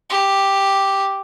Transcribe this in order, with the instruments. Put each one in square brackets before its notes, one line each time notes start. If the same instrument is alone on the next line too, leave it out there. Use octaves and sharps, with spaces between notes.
[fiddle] G4